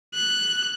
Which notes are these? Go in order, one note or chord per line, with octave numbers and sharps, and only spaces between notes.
F#6